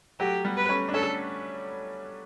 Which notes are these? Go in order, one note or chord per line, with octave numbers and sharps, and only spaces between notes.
F#3 A3 G4
G3 B3
B4
A3 C#4
D4
A3 C#4 A4